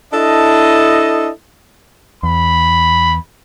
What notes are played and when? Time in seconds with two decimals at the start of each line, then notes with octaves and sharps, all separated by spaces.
0.13 D4 E4 A4 D#5
2.23 E2 B5